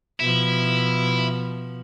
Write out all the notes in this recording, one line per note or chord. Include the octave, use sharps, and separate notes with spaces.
B2 F3 E4